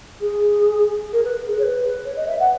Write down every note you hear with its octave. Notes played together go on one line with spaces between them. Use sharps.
G#4
A#4
B4
G#4
C#5
B4
C#5
D#5
E5
F#5